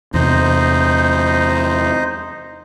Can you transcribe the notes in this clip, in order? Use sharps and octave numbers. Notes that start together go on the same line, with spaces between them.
E2 C3 D#4 C5 D#5